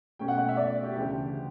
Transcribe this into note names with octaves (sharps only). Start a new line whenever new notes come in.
B2 A3 C#4 G5
F#5
F#5
E5
D5
G4
D2 C#3 E3 G4